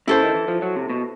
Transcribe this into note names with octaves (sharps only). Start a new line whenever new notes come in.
C#3 E4 A4 C5
D#3
E3
F3
F#3
C3
B2